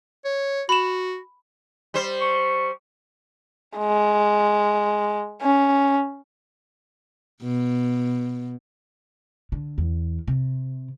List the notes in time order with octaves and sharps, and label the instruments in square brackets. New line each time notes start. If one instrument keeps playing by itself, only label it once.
[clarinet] C#5
[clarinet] F#4 [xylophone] B5 E7
[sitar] G3 C5
[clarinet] C#6
[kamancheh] G#3
C#4
[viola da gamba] B2
[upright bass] D3
E2
C3